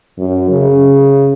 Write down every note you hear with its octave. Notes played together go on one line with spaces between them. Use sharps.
F#2
C#3